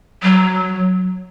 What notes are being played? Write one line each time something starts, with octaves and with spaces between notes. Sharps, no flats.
F#3